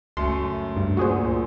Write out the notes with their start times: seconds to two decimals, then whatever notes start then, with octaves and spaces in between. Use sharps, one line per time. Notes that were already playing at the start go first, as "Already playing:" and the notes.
0.17 C#2 F#2 A3 C6
0.77 G2
0.97 A#2 F#4 G#4 C5